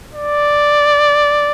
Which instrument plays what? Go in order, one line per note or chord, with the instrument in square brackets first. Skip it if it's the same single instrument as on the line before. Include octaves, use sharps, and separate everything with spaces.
[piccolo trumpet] D5